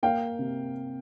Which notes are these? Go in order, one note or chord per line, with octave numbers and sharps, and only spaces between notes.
A#3 F5 G5
C3